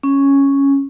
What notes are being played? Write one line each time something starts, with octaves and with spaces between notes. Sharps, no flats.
C#4